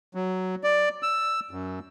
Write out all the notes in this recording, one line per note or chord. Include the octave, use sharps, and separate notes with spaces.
F#3
D5
E6
F#2